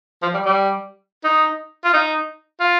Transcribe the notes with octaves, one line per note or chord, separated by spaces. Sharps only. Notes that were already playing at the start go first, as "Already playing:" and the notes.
F3
G3
G3
D#4
F4
D#4
F4